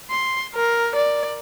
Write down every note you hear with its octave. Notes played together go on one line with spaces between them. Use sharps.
C6
A#4
D5